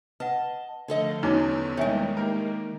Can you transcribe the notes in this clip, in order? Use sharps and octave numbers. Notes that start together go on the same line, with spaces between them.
B4 D#5 F#5 A5
D3 F3 A3 A4 D#5 F5
E2 F#3 C#4 D#4 C#6 D6 E6 A6
D#3 G3 G#3 A#3 D#4 C#5 E5 G#5
G4 A#4